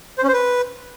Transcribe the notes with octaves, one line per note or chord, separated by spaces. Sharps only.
C5
C#4
C5
B4